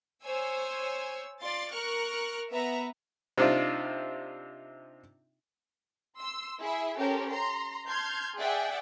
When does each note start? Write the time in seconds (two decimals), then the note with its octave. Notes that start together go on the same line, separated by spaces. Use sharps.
0.23 C5 C#5 G#5 E6
1.42 F4 D5 C6 A6
1.71 A#4 C#6 F6 F#6
2.51 B3 B4 E5 A#5
3.38 C3 C4 D4 D#4 F4
6.18 C6 E6
6.60 E4 G#4 E5
6.98 C#4 G4 A4 A#4 C5
7.29 A#5 C6
7.87 A5 C6 F6 G6 G#6
8.38 G#4 D5 E5 F#5 G5